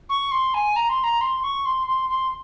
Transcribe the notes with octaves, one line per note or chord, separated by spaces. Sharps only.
C#6
C6
G#5
A#5
C6
A#5
C6
C#6
C6
C6
C6